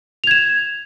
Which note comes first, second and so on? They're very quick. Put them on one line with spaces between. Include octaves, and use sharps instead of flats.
F7 G#6 E7